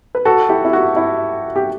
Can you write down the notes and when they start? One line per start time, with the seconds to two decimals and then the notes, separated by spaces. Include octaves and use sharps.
0.15 B4
0.25 F#4 A4
0.49 E4 G4
0.65 E4
0.73 F#4
0.97 E4
1.56 G4